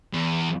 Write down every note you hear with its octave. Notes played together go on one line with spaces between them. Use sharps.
E2